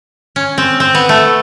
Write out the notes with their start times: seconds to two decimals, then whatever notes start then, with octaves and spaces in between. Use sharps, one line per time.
0.36 C#4
0.58 C4
0.80 C4
0.95 B3
1.09 A3